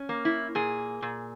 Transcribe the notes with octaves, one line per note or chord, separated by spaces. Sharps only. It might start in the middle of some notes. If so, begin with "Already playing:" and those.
Already playing: C#4
A#3
E4
A#2 G#4
A#2